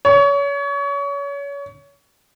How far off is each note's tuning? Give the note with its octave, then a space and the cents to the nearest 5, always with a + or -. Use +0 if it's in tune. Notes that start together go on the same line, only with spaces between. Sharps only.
C#5 +30